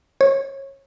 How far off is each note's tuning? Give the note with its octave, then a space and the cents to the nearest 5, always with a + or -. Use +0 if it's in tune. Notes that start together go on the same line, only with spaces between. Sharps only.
C#5 -25